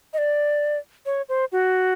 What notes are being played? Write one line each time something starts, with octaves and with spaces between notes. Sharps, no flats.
D#5
D5
C#5
C5
F#4